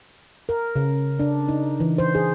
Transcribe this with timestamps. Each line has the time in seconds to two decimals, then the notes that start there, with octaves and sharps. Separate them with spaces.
0.49 A#4
0.76 C#3
1.20 D4
1.49 D#4
1.80 E3
1.98 C5
2.15 G#4